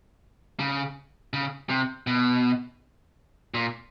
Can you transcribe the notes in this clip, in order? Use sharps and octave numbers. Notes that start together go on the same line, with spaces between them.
C#3
C#3
C3
B2
A#2